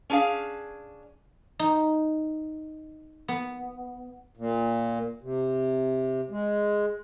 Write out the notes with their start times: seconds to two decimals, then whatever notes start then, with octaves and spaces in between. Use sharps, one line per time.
0.10 C#4 D4 G#4 D5 F5
1.59 D#4
3.28 B3
4.37 A#2
5.22 C3
6.30 G#3